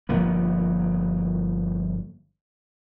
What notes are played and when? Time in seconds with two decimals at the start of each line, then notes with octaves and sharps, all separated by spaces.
0.09 G1 F3 A#3 B3